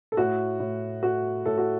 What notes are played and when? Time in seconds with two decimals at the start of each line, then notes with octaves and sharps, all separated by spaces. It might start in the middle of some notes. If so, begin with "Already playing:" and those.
0.12 A4
0.17 A2 F#4
0.60 A2
1.03 A3 F#4
1.46 A2 A4
1.58 F#4